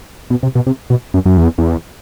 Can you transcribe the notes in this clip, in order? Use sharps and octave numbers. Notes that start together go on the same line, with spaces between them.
B2
C3
B2
C3
B2
F#2
F#2
E2
E2